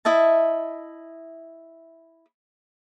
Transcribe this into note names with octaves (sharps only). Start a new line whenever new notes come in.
E4 D#5 E5 A5